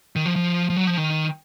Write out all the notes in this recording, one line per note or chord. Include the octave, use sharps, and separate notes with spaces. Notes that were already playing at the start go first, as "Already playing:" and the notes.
D#3
F3
F3
F3
F#3
F3
D#3